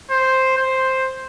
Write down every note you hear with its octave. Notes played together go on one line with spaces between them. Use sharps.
C5
C5